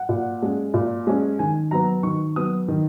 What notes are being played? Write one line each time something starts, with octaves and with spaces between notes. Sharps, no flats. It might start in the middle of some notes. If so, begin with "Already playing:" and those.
Already playing: F#5
A#2
G#3 C#4
A#2
G#3 C#4
D#3 G#5
F#3 B3 A#5
D#3 C#6
F#3 B3 D#6
D#3